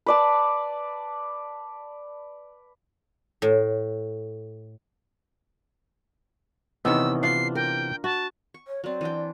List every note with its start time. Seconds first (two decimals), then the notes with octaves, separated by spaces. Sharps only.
0.06 B4 D5 A5
3.42 A2
6.85 C3 D#3 E3 B3 C#4 D#4 E6
7.23 D4 F4 C7
7.55 A#4 G5
8.04 F#4 A5
8.54 C#6
8.67 C#5
8.84 F#3 C4 D5
9.01 E3 D4 G5